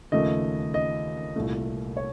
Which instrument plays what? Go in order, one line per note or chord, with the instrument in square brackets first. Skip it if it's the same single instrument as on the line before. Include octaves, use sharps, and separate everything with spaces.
[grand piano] D#2 C#3 F3 A3 D#5
D#5
C2 A#2 A3
C#5